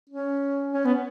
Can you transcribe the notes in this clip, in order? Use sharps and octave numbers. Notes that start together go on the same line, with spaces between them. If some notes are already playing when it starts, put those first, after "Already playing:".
C#4
C#4
B3